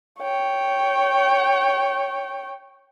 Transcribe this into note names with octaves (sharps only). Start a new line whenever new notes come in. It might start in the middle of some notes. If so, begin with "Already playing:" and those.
C#5 G5